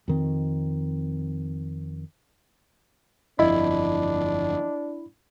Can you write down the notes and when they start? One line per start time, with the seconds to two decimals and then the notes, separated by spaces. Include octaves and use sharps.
0.08 F2 D#3 C4
3.39 G1 F2 D4 E4 D#5 B5